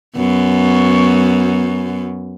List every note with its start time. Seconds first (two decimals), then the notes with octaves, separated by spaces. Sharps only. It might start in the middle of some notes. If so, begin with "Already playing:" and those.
0.15 F#2 B3